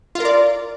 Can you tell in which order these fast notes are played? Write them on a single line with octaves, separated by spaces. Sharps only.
F4 A#4 D5